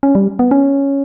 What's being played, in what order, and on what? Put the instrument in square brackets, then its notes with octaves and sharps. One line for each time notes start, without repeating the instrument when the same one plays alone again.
[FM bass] C#4
G3
B3
C#4